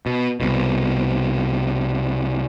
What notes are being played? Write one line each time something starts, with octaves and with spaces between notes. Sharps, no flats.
B2
C2 B2